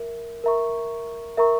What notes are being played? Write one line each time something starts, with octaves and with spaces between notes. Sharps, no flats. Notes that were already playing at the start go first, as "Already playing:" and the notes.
Already playing: A#4 E5
A#4 E5 A#5 C#6
A#4 E5 A#5 C#6